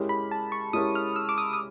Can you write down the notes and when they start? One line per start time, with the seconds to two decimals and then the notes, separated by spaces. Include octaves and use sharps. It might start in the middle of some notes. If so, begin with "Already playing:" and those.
Already playing: G#3 C#4 E4 G4 A#4
0.09 B5
0.31 A5
0.52 C#6
0.73 G#3 C#4 E4 G4 A#4 D#6
0.95 F6
1.16 E6
1.29 D6
1.38 D#6
1.53 D#6